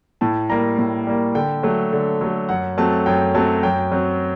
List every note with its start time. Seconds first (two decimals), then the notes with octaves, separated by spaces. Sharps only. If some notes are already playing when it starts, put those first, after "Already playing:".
0.21 A2 A5
0.49 G3 A#3 A#5
0.79 A2
1.07 G3 A#3
1.35 D3 G5
1.63 F#3 A3
1.93 D3
2.21 F#3 A3
2.49 F#2 F#5
2.78 F#3 A3 C4 A5
3.06 F#2 G5
3.35 F#3 A3 C4 A5
3.63 F#2 G5
3.92 F#3 C4